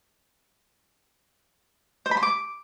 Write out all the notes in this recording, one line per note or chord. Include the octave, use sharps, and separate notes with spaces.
C5
B5
C6
D6